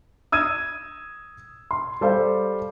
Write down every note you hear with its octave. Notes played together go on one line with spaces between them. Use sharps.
D#6 E6 G#6 D#7
C6
G3 A4 C5 F5